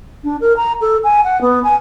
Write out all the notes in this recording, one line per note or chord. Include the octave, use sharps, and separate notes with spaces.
D4
A#4
A#5
A4
G#5
F#5
B3
G#5